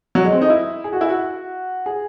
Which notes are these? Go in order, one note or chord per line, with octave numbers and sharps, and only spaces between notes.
F#3
G#3
C4
D#4
E4
G#4
F#4
E4
F#4
G#4